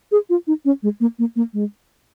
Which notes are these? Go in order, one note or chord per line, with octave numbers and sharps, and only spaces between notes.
G#4
F4
D#4
C#4
G#3
A#3
A#3
A#3
G#3